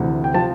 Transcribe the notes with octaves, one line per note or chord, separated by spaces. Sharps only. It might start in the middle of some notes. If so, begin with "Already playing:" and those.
Already playing: D2 C3 E3
G5
C3 F3 A5